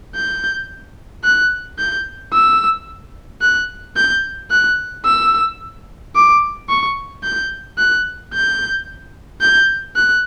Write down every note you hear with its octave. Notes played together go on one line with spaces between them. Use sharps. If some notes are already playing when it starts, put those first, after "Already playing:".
G6
F#6
G6
E6
F#6
G6
F#6
E6
D6
C#6
G6
F#6
G6
G6
F#6